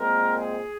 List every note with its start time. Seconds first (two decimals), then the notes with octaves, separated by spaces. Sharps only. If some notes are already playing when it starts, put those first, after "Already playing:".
Already playing: A#2 G#3 C4 A#4
0.35 G#4